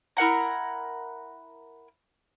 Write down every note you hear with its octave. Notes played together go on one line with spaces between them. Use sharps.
E4 A#4 F#5 A#5